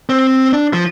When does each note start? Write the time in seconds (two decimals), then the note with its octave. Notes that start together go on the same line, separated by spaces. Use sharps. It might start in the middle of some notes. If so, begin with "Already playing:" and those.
0.09 C4
0.53 D4
0.73 F3